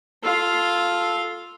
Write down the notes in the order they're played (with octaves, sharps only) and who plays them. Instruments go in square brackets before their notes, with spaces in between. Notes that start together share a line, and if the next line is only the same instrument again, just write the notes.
[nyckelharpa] F4 F5 [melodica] A4